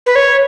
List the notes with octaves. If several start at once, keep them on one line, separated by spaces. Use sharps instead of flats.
B4
C#5